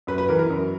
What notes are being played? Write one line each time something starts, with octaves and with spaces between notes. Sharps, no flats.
F#2 B4
B4
E3 A#4
A#4
F#2